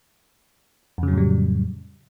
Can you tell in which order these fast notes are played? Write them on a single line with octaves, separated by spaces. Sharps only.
F2 C#3 F#3 A2 G3